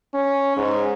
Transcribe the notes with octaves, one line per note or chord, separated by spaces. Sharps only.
C#4
G#2